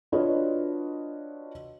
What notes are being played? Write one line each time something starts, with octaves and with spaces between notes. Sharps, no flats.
D4 F4 F#4 B4 C#5 D#5